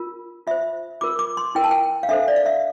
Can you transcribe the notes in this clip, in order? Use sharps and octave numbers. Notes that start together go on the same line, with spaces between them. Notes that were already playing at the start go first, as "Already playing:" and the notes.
Already playing: F4 A#4
F4 C5 E5
F4 A#4 D6
D6
C6
E4 A#4 G5
A5
G5
F5
D4 A4 C5 E5
D5
F5
E5